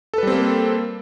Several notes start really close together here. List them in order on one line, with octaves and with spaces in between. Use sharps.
A4 B4 G3 C4 A#3